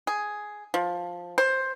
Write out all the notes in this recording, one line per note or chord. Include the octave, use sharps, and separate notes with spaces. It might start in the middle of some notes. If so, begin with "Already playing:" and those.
G#4
F3
C5